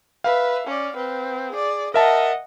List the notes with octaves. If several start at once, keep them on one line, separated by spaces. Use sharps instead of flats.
B4 E5 F5
C#4 D5
C4 B4
G#4 D5
A#4 D#5 E5 F#5 A5